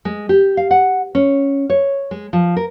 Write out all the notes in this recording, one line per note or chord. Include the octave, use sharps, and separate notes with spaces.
G#3
G4
F5
F#5
C#4
C#5
G#3
F3
A#4